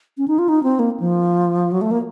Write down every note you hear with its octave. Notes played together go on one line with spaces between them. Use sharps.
C#4
D#4
F4
D#4
C4
A#3
F3
F#3
A3
A#3